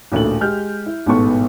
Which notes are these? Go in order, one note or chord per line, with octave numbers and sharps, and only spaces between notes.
A1 D2 A#2 A3 F#7
G#3 G4 F6 G6
E4
A1 G#2 B2 B3 A4 C#6